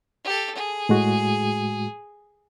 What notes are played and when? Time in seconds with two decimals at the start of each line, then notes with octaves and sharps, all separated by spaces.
0.24 G4 A4
0.55 G#4
0.89 A2 G#3 F#4